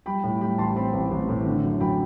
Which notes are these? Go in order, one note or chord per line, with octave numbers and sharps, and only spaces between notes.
G3 G5 B5
A2
G3 G5 B5
A1 A5 C6
C4 G5 B5
A1
A1
A2
D3
F#2
F#2 G5 B5